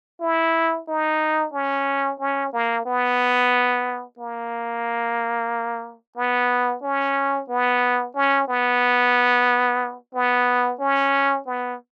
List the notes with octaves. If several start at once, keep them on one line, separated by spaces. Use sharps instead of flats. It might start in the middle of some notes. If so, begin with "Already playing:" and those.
E4
D#4
C#4
C#4
A#3
B3
A#3
B3
C#4
B3
C#4
B3
B3
C#4
B3